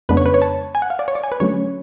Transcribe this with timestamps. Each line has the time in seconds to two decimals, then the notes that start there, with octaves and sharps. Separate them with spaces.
0.09 F2 C#3 G#3 B3 D4 B4
0.17 C#5
0.26 B4
0.34 C#5
0.42 A5
0.75 G#5
0.82 F#5
0.90 F5
0.99 D5
1.08 C#5
1.15 D5
1.24 G#5
1.32 B4
1.40 D3 F#3 A3 C#4 C#5